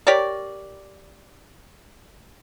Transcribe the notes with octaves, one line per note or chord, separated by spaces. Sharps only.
G4 A#4 C#5 D5